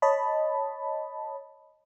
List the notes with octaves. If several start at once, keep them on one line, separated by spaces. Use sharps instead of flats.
C#5 D#5 A5 B5